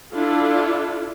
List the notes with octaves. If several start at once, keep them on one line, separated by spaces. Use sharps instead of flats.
D4 E4 F4 A4